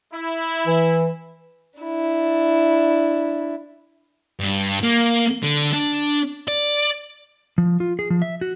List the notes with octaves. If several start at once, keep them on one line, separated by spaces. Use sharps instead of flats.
E4
E3
D4 E4
G2
A#3
D3
D4
D5
F3
F4
G#4
F3
E5
F#4